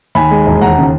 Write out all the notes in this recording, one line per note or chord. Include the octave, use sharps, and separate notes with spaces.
D#2 G#5 B5
G#3
E1
D#2 F#5 A#5
C#3